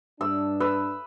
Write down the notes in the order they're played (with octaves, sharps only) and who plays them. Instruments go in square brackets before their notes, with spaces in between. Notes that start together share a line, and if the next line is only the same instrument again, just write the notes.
[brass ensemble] G2 D4 [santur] E6
[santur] B4 E6